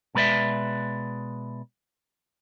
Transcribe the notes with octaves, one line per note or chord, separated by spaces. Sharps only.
B2 G#3 B4 D5 E5